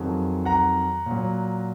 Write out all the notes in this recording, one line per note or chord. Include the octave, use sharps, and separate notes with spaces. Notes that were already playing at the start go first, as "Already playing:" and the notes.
Already playing: F2 D#3 F#3 G#4
F#5 A#5
A#2 F#3